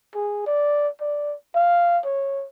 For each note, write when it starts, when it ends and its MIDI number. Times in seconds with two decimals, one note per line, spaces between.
0.15 0.43 68
0.47 0.88 74
1.01 1.35 74
1.55 1.99 77
2.05 2.46 73